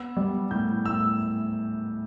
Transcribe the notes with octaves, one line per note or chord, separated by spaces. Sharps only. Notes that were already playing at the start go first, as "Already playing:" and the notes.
Already playing: B3 E6
G3
A2 G6
A2 E6